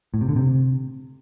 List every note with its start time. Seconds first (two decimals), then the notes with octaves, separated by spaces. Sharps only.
0.14 A2
0.21 C3
0.29 D3
0.36 C3